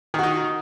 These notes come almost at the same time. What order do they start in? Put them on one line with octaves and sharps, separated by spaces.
D#3 F#4 D#4